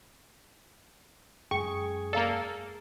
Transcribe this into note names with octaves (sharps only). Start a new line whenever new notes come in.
F#2 G#3 G#4 G5 C#6
A#3 A4 D5 F5 A#5